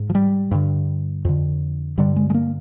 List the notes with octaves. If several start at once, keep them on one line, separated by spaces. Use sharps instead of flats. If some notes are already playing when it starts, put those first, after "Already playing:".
Already playing: G#2
F3
G3
G2 D3
F2 D3
G2 D3 G3
G#3
G#3
A#3